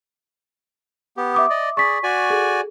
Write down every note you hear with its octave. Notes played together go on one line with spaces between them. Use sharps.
B3 G4
E5 D6 D#6
D5 D#5
G#4 D5 C#6 B6
F#4 D5 G#5
G#4 A4